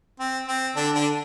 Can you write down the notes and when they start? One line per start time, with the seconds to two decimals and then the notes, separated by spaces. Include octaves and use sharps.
0.20 C4
0.48 C4
0.76 D3 D4
0.95 D3 D4